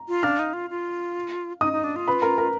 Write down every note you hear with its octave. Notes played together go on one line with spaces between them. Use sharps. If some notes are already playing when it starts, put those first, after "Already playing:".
Already playing: A#5
F4
D4 F5 F6
D#4
F4
F4
D#4 D#5 D#6
D#4
D4
F4
B4 B5
A#4 A#5
A#4 A#5